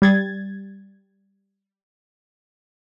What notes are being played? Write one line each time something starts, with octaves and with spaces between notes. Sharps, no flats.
G3 G#6 A6